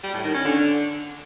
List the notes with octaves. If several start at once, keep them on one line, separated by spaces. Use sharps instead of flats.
G3
A2
D#3
C#4
D3